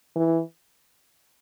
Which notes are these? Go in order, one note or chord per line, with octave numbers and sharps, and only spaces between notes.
E3